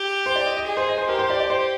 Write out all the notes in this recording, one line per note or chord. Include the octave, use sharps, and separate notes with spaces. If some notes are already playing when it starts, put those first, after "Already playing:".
Already playing: G4
C5
D5
D#5
D#5
G#4
C5
D#5
C5
G4 A#4
C5
D5
D5
C5